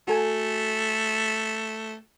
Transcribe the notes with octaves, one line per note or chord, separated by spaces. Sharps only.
A3 F#4 A4 G#5